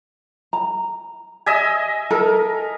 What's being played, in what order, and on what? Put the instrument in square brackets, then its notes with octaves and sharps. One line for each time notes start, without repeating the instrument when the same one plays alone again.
[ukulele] A#5
[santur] D#5 E5 G#5
[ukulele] A4 [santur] A#4